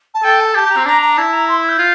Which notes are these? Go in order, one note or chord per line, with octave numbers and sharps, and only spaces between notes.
A5
A4 G5
A5
G4 A5
G4 A#5
C4
D4 A#5
A#5
E4 A5
A#5
C6
E6
G6
F4